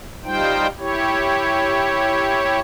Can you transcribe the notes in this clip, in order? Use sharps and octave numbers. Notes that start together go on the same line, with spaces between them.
G3 D#4 F4 C5 G5
E4 G4 C#5